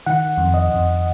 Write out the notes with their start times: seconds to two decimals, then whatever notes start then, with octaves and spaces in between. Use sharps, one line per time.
0.06 D#3 F#5
0.38 F2
0.54 D#5
0.69 F2